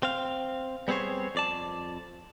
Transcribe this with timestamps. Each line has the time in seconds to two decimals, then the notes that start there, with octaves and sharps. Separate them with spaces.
0.03 C4 F5
0.88 G3 B3 C4 G#4 C5 C#5
1.35 F2 D5 A5